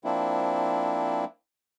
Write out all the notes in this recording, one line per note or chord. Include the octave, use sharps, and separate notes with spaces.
F3 A#3 C4 D4 E4